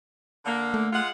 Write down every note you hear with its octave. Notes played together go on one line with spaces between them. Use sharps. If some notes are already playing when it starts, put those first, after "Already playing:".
D3 A#3
A3
G#3 F4 F#5